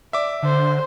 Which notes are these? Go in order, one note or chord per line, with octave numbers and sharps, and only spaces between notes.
D5 E5 D6
D3 C5